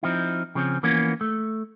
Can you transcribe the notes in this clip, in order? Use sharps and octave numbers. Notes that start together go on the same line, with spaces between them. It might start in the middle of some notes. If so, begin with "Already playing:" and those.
F3 C4 D#4 E4
C#3 F3 C4 C#4
E3 F3 A#3 B3 C#4
A3